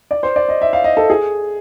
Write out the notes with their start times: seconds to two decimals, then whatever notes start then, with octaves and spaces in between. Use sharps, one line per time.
0.11 D5
0.23 C5
0.36 D5
0.49 D#5
0.61 E5
0.73 F5
0.84 D#5
0.97 A4
1.10 G#4